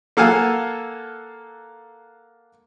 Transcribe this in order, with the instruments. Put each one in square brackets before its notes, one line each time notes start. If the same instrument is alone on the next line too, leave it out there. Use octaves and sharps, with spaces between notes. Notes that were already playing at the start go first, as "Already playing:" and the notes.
[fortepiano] A#3 A4 F5 F#5 G#5